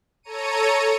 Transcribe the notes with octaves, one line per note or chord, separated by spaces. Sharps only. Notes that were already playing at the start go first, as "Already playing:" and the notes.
A4 C#5 A#5 C#7 D#7